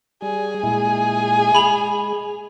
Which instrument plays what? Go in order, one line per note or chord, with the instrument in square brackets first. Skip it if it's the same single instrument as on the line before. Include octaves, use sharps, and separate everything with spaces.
[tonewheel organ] G3 [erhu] G#4
[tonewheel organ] A#2 G#3 E4
[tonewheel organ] G#3 [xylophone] B5 F7